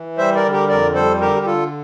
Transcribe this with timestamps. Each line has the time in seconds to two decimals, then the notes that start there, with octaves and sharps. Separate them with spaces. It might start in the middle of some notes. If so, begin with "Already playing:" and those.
Already playing: E3
0.18 G3 C5 E5
0.35 A#4 D5
0.44 D3
0.52 G4 A#4
0.69 F2 A#4 D5
0.95 G3 A4 C5
1.21 D3 G4 A#4
1.36 G4
1.46 D3 F4 A4